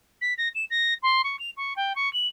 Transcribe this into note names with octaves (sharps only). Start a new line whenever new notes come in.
B6
A#6
E7
A#6
C6
C#6
F7
C#6
G5
C#6
F#7